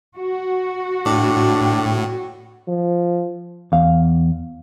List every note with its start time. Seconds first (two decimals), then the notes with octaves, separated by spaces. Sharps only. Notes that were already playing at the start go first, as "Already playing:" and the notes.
0.16 F#4
1.06 A2 D4 G5
2.68 F3
3.72 E2 F5